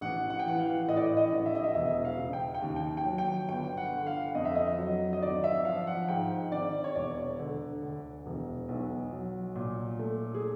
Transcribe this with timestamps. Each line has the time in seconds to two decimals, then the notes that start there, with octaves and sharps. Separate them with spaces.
0.01 A1 F#5
0.30 F#5
0.39 G5
0.46 E3 F#5
0.59 F5
0.88 A2 D#5
0.97 D5
1.05 D#5
1.17 D#5
1.32 A1
1.46 E5
1.55 D#5
1.64 E5
1.75 E1 E5
2.05 F5
2.18 C#3
2.33 G5
2.55 G5
2.62 D#2
2.76 G5
2.97 G5
3.05 F#3
3.18 G5
3.49 G1 G5
3.77 F#5
3.93 D3
4.07 F5
4.35 F2 D#5
4.45 E5
4.55 D#5
4.79 F#3
5.13 D#5
5.22 G#1 D5
5.44 E5
5.65 F3 F5
5.87 F#5
6.08 G#2 G5
6.52 G#1 D5
6.84 C#5
6.95 E1 D5
7.39 D3
7.82 D2
8.26 E1
8.69 B1
9.12 F#3
9.56 A#2
9.99 A3
10.34 G#4